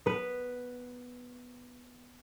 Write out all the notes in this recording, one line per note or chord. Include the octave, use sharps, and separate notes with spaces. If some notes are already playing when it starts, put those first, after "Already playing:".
B3 B4